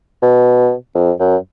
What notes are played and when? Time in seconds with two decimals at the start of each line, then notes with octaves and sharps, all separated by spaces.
0.23 B2
0.95 F2
1.20 F#2